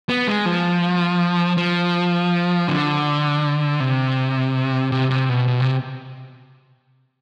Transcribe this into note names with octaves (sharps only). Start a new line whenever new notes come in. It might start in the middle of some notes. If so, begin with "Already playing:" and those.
B3
G#3
F3
F3
D3
C3
C3
C3
B2
B2
C3